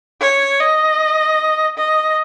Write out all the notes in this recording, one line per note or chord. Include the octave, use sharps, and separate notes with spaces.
C#5
D#5
D#5